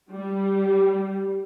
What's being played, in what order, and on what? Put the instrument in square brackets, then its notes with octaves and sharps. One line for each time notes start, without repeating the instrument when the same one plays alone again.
[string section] G3